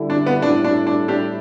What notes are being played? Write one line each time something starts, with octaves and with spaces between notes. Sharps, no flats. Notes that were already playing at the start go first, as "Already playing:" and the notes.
Already playing: D3 G3 E4 A4
D4
B3
A2 G3 D4 E4 A4
D4
D4
D4 G4